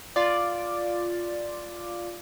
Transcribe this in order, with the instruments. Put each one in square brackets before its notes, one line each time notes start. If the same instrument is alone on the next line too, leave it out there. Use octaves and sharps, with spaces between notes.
[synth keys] F4 D5